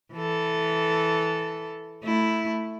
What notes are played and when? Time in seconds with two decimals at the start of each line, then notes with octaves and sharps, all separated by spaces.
0.13 E3 A4
2.03 A3 E4